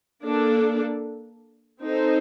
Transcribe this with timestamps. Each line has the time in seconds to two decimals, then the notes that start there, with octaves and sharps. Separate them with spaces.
0.24 A#3 D4 A4 D5
1.83 C4 D#4 A4 C5